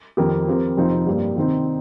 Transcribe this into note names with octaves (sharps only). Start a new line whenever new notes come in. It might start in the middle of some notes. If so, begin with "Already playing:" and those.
F2 D#3 C4 G4 A#4
F3 C4 G4 A#4
F2 C3 F3 C4 D#4
G2 G3 A#3
C3 D#3 C4 D#4